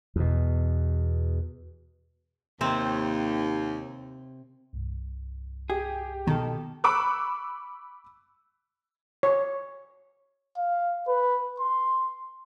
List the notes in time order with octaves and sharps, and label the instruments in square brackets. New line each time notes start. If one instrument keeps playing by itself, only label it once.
[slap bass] E2 B2
[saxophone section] D#2 [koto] C3 C4
[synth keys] C2 G2
[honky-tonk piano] G4 [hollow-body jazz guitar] G#4
[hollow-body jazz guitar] B2 A4 [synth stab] D#3
[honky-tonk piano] B5 C#6 D6 E6 F#6
[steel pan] C#5
[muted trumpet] F5
B4
C6